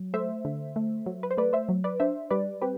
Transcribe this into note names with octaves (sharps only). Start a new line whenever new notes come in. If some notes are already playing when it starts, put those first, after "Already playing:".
Already playing: F#3
A3 C5 E5
D3
A3
F#3
B4
C5
A3 B4 D5
C5 E5
F#3
B4 D5
D4 C5 E5
G3 B4 D5
C4 G4 B4